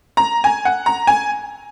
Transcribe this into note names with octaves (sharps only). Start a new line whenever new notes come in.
A#5
G#5
F#5
A#5
G#5